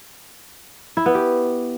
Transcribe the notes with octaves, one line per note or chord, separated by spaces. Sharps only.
E4
B3
G4